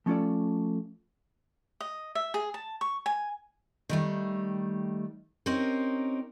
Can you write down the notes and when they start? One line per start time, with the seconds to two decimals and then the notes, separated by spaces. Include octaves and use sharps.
0.06 F3 A3 C#4 F4 A4 D5
1.80 D#5
2.15 E5
2.34 G#4
2.54 A5
2.81 C#6
3.06 G#5
3.89 D#3 G3 A3
5.46 C4 C#4 D#4 G4 A#4